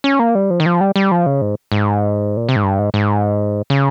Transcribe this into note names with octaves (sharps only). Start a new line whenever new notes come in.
C#4
A#3
G3
F3
D#3
F3
G3
G3
F3
C#3
G#2
G#2
A#2
C3
G#2
G2
G#2
G#2
C#3